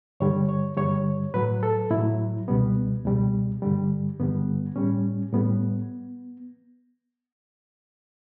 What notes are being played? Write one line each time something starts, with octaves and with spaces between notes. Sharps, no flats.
G2 D3 G3 C#5
C#5
G2 D3 G3 C#5
A2 F#3 B4
A4
A2 F#3 E4
C#2 B2 G3 B3
C#2 B2 G3
G2 D3 G3
G2 D3 G3 B3
A2 G3 C#4
A2 G3 B3